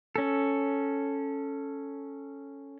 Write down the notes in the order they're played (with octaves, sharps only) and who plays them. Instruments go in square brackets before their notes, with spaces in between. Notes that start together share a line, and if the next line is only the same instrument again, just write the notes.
[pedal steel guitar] C#4 A4